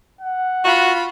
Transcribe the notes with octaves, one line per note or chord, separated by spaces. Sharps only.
F#5
F4 F#4 B5